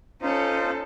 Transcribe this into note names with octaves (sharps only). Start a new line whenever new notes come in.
C#4 D#4 F4 A4 C5